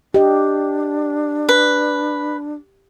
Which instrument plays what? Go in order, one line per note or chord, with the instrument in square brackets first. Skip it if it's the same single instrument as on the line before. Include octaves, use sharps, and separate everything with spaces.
[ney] D4 [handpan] G4 D#5
[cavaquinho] B4